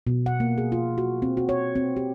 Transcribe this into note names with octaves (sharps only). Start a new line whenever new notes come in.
B2
F#5
A#3
G#4
F4
F#4
C4
F#4
C#5
C4
G4